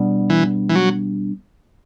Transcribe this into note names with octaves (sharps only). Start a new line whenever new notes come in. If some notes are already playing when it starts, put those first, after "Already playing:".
Already playing: B2 G3 B3 D4
E3
E3
F#3